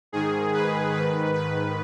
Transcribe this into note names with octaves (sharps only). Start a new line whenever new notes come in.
G#2 D#3 G#4
B4
G#2 D#3 B4
B4